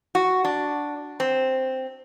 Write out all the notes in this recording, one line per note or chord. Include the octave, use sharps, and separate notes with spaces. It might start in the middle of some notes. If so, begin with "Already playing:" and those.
F#4
D4
C4